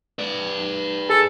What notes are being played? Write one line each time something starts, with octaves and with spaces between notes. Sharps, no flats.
B4 D5
G#4 A4